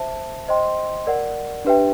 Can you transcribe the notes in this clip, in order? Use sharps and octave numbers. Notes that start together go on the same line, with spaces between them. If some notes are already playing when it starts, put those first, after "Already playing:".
Already playing: C5 E5 A5
C5 D#5 G5 C6
A#4 D5 F#5
D4 G4 B4 E5 G5